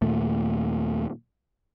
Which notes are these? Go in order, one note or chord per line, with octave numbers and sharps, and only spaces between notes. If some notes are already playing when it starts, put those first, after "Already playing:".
D#2 A#2 A3